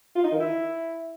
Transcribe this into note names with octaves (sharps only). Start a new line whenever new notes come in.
F4
D#4
D#3
E4